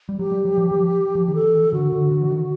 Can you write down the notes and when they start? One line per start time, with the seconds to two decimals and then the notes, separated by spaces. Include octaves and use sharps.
0.09 G3
0.19 F#3 G4
0.32 G3
0.45 F#3
0.58 F3
0.71 F#3
0.77 F3
1.15 F3
1.28 D#3
1.34 E3 A4
1.73 D3 F#4
1.92 D3
2.11 D3
2.21 E3
2.31 D#3